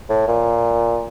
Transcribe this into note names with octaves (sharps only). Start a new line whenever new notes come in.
A2
A#2